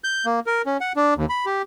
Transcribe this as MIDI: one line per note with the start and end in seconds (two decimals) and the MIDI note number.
0.04 0.26 91
0.26 0.40 58
0.46 0.62 70
0.66 0.77 61
0.81 0.92 78
0.96 1.14 62
1.17 1.25 39
1.29 1.45 83
1.46 1.62 67